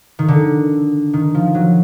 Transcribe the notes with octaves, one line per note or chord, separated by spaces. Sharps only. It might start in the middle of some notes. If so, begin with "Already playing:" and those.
D#3
D3
D#3
F3
F#3